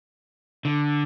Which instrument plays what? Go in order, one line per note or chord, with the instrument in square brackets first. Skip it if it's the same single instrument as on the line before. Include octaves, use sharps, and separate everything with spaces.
[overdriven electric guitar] D3